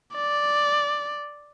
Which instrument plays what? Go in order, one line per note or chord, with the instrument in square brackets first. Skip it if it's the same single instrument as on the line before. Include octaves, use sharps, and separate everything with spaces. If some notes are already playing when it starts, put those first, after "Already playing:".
[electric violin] D5